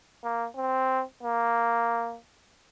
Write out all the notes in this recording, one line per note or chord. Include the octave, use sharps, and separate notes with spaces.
A#3
C4
A#3